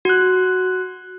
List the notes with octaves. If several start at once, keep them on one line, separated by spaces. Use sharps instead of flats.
F#4 F#6